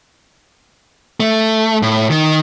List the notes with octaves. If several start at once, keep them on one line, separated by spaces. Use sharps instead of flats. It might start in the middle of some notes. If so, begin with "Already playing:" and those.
A3
A2
D#3